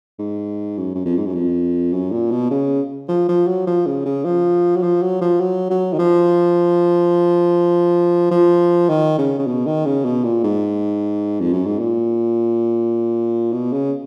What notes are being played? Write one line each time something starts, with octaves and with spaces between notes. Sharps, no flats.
G#2
F#2
F#2
F2
G#2
F#2
F2
F#2
A#2
B2
C#3
F3
F3
F#3
F3
C#3
C#3
F3
F#3
F3
F#3
F3
F#3
F#3
D#3
F3
F3
D#3
C#3
C#3
B2
D#3
C#3
B2
A#2
G#2
F2
F#2
G#2
A#2
B2
C#3